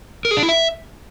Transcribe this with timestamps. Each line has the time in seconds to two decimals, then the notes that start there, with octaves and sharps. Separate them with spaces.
0.25 A#4
0.31 G#4
0.37 D4
0.43 E4
0.49 E5